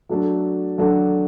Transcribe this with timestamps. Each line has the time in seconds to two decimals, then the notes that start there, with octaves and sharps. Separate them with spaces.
0.09 F#3 A3 D4 F#4 A4
0.78 F#3 A3 D4 F#4 A4